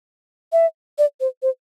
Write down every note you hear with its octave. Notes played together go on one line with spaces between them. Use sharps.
E5
D5
C5
C5